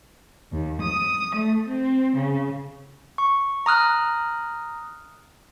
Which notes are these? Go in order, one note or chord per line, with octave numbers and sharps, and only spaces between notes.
D#2
D#6
A3
C4
C#3
C#6
A#5 D#6 F6 F#6